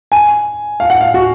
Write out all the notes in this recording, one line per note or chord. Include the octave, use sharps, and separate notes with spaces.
G#5
F5
F#5
F5
F#4